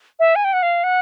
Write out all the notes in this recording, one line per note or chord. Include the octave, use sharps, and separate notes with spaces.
E5
G#5
G5
F#5
F5
F#5